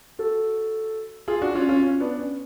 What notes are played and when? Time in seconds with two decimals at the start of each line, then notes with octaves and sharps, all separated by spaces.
0.19 F#4 A4
1.28 F4 G#4
1.42 D4 F#4
1.55 C#4 F4
1.69 C#4 F4
1.83 C#4
2.00 B3 D4
2.19 C#4